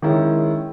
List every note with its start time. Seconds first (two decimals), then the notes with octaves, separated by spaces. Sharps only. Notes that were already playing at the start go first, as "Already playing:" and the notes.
0.02 D#3 G#3 C#4 E4